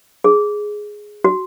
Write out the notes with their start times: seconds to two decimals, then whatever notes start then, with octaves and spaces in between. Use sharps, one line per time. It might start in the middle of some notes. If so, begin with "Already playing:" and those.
0.24 G#4
1.24 F#4